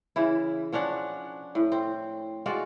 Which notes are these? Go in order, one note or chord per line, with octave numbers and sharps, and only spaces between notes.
C#3 E3 E4
F3 C#4 D4 F#5
A2
C4
G#3 F4 F#4 D5